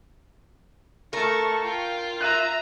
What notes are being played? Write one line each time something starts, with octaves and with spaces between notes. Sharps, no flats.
A3 A4 A#4 A5 C#6
F4 G5
E5 A#5 F#6 D#7